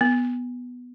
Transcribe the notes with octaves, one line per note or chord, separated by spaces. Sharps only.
B3